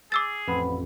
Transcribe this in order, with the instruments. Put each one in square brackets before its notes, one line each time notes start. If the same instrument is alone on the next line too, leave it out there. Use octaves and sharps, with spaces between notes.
[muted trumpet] G#4 [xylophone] D6 E6 A6
[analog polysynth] A1 F2 [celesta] B4 F#5 B5